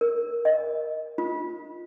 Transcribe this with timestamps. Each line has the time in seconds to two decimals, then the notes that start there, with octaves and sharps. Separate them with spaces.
0.01 A#4
0.45 D#5
1.18 F4